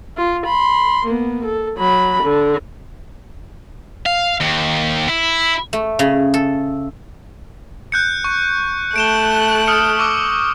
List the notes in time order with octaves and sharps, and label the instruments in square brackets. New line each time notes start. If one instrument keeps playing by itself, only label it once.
[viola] F4
B5 C6
A#3 B3
A4
F#3 B5
D3
[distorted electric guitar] F5
D#2
E4
[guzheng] A3
C#3
A4
[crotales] F#6 G6 C#7
C#6
[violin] A3 F#6 [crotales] D7 E7 G7
[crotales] D#6 F6 C#7
C#6 D6 E6